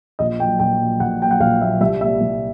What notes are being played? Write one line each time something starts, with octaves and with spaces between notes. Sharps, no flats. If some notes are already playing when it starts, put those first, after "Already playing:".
A#1 D#5
A#2 F#3 G5
A#1 G5
A#2 F#3
A#1 F#5
A#2 F#3 G5
F#5
A#1 F5
A#2 F#3 E5
C2 E5
A#2 G3 E5
C2